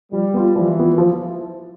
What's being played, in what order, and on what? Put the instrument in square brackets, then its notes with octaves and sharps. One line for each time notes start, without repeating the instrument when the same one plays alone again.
[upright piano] F3 [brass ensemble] G3
[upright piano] B3 F4
[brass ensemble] E3 [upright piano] F3
[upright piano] B3 F4
F3